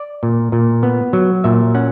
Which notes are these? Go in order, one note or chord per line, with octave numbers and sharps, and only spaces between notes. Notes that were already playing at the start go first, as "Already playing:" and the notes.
Already playing: D5
A#2
A#2
B3
F#3
A#2 E5
C#4 F#5